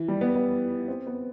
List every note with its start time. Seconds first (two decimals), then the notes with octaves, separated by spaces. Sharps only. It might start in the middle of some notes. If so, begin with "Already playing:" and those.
Already playing: E3
0.08 G3
0.21 B3
0.35 B3
0.88 C4
1.07 B3